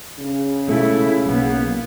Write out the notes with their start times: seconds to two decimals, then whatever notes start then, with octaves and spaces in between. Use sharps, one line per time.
0.18 C#3
0.67 B2 G#3 A3 E4
1.26 B1 A#3 B3